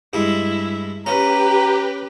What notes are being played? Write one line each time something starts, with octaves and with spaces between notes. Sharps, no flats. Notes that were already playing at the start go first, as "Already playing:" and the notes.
G2 G#3 E4
C#4 G4 B4 A#5